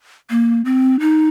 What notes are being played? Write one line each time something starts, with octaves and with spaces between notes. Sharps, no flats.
A#3
C4
D#4